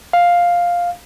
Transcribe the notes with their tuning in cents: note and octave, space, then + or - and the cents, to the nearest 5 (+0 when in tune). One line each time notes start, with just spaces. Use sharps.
F5 +5